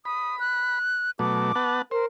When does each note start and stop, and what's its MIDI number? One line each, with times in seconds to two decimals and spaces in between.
0.05 0.79 83
0.05 0.36 87
0.39 1.11 90
1.19 1.52 47
1.19 1.52 54
1.19 1.52 57
1.19 1.78 86
1.55 1.82 59
1.55 1.82 78
1.55 1.82 81
1.91 2.05 70
1.91 2.06 72